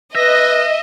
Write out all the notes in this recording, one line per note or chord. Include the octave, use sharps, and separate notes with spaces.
B4 D#5 E5 A#6